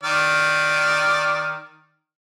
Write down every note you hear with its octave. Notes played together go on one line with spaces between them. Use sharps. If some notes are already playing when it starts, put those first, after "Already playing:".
D#3 D5 F6